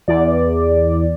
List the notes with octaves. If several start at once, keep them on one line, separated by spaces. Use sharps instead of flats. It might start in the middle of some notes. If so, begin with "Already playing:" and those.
E2 D5